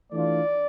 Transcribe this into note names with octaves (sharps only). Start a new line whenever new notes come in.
E3 A3 D4 F4 D5